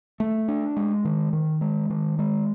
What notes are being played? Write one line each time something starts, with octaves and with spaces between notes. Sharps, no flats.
A3
D4
G#3
D#3
D#3
G#3
D#3
G#3